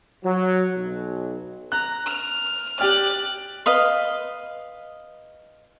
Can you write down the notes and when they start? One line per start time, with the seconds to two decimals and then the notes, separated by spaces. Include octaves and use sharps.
0.24 F#3
0.75 B1
1.72 A#5 F#6
2.06 F6
2.80 G4 D5 G5 F6 F#6
3.66 B4 D#5 F5 C6